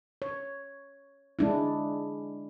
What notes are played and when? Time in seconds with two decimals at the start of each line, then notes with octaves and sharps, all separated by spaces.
0.22 C#5
1.39 G#3 D4 E4